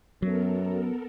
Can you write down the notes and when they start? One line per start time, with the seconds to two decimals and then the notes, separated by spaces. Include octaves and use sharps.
0.22 F#2 F#3 B3 A4 A#4